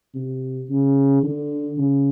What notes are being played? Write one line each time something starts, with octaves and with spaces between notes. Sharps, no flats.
C3
C#3
D3
C#3